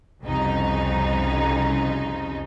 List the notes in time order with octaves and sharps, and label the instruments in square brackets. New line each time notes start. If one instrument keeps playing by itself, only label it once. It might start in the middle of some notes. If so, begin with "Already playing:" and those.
[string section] C2 F2 C#3 D#4